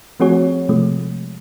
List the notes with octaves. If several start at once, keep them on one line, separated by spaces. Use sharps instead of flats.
F3 A3 C4 F#4 G#4 C#5
C3 F3 G#3 A3